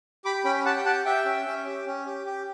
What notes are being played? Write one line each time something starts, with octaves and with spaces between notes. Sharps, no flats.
G4 B5 D6
C#4 G5 B5
G4 F#5 A5
G5
G4 F#5 A5
G4 E5 G5
C#4
C#4
G4
C#4
G4
G4